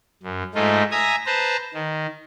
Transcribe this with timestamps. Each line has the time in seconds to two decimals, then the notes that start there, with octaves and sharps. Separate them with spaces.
0.23 F#2
0.55 G#2 A3 D#4 F4
0.91 E5 G#5 A#5 D#6
1.26 B4 C5 A5 A#5
1.74 D#3